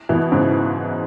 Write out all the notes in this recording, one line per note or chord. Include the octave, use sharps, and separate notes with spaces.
B2 E3
G#2 C#3